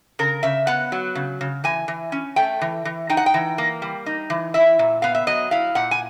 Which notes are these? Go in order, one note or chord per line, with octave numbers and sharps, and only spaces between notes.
C#3 A#4
C#3 E5
B3 F#5
F#3
C#3
C#3
E3 G#5
E3
C#4
A3 G5
E3
E3
D#4 G5
F#5
G5
E3
A#3
G3
D#4
E3
E4 E5
A#2
B3 F5
E5
F#3 D#5
E4 F5
A#2 F#5
G#5